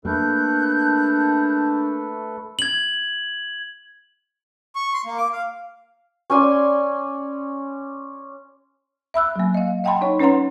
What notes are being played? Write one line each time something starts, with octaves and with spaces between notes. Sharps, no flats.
A3 A#3 D4 A4 B4 F#6 G6
G#6 F#7
C#6
C6
A#3
D6
F5
C#4 D5 G#5 C6
E5 B5 E6 F#6
F#3 A#3
D#5 F5
D#5 F#5 G5 A5 B5 C6
D#4 C#5
C#4 B4 C#5 F#5 A#5 C6